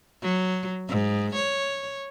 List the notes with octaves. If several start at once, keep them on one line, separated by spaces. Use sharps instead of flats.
F#3
G#2
C#5